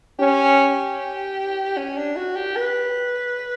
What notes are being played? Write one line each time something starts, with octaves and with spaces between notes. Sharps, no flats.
C#4 G4
C#4
D4
F#4
G4
B4